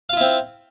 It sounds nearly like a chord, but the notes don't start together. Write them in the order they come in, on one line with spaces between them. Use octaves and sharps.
F5 F4 E4 C4